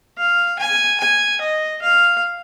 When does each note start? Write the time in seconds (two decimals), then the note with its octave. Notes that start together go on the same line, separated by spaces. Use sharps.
0.18 F5
0.59 G#5
1.00 G#5
1.41 D#5
1.82 F5